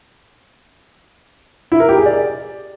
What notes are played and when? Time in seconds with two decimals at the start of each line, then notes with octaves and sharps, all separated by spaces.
1.72 E4
1.80 A#4
1.89 G4
1.97 G#4
2.06 D5